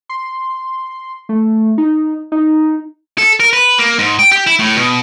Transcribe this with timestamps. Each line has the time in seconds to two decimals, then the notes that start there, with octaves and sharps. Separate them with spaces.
0.09 C6
1.29 A3
1.78 D#4
2.32 D#4
3.18 A4
3.40 A#4
3.53 B4
3.78 A#3
3.99 G#2
4.19 G5
4.32 G4
4.47 E4
4.59 A2
4.77 B2